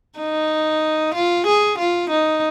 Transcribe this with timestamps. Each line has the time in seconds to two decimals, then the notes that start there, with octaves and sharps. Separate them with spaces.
0.19 D#4
1.15 F4
1.47 G#4
1.78 F4
2.10 D#4